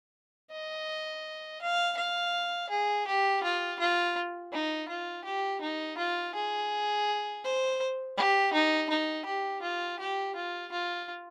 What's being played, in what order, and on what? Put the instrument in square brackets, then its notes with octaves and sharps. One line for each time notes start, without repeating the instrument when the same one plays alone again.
[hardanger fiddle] D#5
F5
F5
G#4
G4
F4
F4
D#4
F4
G4
D#4
F4
G#4
C5
G4
D#4
D#4
G4
F4
G4
F4
F4